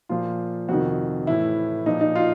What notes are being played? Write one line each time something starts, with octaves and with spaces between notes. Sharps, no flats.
A#2 F3 F4
F2 C3 D#3 F#4
A2 E3 E4
A#2 F3 D#4
D#4
F4